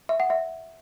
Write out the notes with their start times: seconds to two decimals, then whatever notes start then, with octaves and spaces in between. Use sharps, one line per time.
0.09 E5
0.20 F#5
0.30 E5